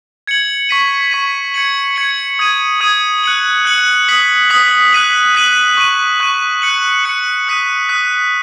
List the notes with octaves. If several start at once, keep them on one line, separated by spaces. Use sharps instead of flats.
G#6 C#7 F#7
C#6 B6 D#7
C#6 B6 D#7
G#6 C#7 F#7
G#6 C#7 F#7
D#6 G#6 D#7
D#6 G#6 D#7
F#6 C#7 F#7
F#6 C#7 F#7
D#6 B6 F#7
D#6 B6 F#7
F#6 B6 D#7 F#7
F#6 B6 D#7 F#7
C#6 F#6 D#7
C#6 F#6 D#7
F#6 C#7 F#7
F#6 C#7 F#7
D#6 F#6 B6 D#7
D#6 F#6 B6 D#7